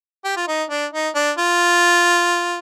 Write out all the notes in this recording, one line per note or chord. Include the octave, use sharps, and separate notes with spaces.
G4
F4
D#4
D4
D#4
D4
F4